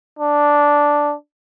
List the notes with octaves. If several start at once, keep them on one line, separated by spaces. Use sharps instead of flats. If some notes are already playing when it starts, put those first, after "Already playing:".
D4